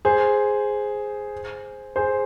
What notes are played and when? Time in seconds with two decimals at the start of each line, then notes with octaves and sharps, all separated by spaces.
0.05 G#4 C5
1.96 G#4 C5